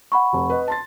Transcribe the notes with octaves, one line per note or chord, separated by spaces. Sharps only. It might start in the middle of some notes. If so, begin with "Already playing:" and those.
F#5 B5 C#6
F1
B4 D#5
A5 C6 A6